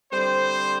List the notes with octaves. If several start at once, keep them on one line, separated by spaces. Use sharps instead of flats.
D3 G3 C4 C5